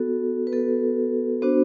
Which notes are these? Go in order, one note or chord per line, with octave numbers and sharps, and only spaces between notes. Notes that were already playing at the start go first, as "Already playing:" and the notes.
Already playing: B3 F#4 A4
B4
B3 F#4 A4
B3 D4 F#4 C5